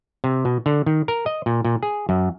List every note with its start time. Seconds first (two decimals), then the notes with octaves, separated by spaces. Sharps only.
0.24 C3
0.45 B2
0.66 D3
0.86 D#3
1.08 A#4
1.26 D#5
1.46 A#2
1.65 A#2
1.83 G#4
2.09 F#2